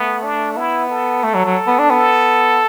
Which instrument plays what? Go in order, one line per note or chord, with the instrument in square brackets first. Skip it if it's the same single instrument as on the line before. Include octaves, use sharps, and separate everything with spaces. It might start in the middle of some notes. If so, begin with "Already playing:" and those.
Already playing: [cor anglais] A3 [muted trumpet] B3
[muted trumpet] D4
[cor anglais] B3 [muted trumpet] E4
[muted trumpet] A4
[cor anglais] A3
F#3
F#3
B3
D4
[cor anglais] B3 [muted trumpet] A4